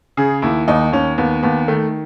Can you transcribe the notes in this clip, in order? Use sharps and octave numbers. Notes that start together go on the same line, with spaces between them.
C#3 G#4
D#2 E4
D#2 D#4
D#2 C#4
D#2 B3
D#2 B3
D#3 A3